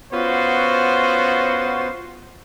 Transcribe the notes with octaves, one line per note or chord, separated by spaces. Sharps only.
B3 C#4 F4 F#4 C5